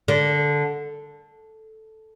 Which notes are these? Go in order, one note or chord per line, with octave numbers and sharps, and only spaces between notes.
D3